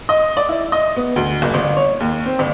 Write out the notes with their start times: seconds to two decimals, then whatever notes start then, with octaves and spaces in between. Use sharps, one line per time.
0.09 D#5
0.37 D5
0.49 E4
0.72 D#5
0.96 B3
1.16 D2
1.42 F#1
1.54 G1
1.77 C#5
2.00 D#2
2.26 C4
2.39 G1